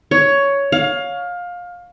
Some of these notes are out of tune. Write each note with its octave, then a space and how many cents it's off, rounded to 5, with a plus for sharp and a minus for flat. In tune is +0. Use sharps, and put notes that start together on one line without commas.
C#5 +10
F5 +20